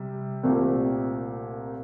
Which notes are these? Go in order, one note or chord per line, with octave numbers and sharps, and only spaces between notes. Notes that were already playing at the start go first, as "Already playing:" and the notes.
Already playing: C3 G3
C2 A#2 A3 C4 G4